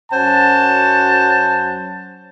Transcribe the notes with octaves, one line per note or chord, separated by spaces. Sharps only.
F#2 F#3 C#4 C5 F#5 A5